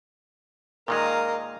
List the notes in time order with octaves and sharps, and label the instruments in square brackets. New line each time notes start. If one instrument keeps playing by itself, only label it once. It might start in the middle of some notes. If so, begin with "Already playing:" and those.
[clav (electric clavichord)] A#2 D#3 G#3 [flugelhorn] A#4 [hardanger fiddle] D#5 F5